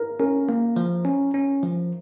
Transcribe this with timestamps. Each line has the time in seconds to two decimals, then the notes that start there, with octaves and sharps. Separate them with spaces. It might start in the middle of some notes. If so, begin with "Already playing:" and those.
Already playing: A#4
0.20 C#4 A#4
0.49 A#3
0.76 F3
1.05 C#4
1.34 C#4
1.63 F3